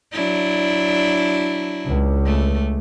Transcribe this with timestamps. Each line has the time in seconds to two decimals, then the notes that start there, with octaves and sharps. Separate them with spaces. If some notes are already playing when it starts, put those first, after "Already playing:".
0.13 F#3 D4 E4
1.87 C#2
2.26 A3